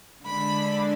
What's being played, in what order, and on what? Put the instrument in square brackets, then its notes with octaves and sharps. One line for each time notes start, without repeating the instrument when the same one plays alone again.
[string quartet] D3 G#3 D4 B5